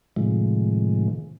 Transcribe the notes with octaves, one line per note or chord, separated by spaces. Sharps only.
A2 C3 D#3 F3 G#3